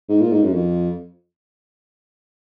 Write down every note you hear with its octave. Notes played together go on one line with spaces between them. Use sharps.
G#2
A#2
G#2
F#2
F2